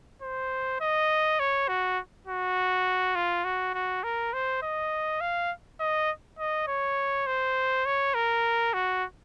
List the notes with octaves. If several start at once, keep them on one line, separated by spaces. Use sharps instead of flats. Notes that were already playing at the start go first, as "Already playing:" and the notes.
C5
D#5
C#5
F#4
F#4
F4
F#4
F#4
A#4
C5
D#5
F5
D#5
D#5
C#5
C5
C#5
A#4
F#4